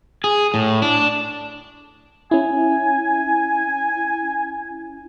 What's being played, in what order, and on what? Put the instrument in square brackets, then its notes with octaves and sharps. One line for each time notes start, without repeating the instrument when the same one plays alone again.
[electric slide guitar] G#4
A2
D4
[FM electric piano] C#4 E4 [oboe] G#5